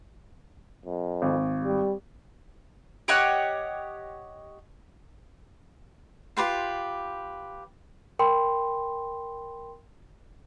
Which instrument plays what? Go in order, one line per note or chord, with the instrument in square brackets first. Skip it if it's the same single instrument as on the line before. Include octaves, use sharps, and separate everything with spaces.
[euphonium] F2
[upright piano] G#1
[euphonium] G3
[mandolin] G4 C#5 D#5 F#5
[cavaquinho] F4 G4 B4 C6
[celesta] A#4 G5 B5 C6